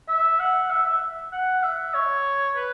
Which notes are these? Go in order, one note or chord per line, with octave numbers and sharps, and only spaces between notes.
E5
F#5
E5
E5
F#5
E5
C#5
B4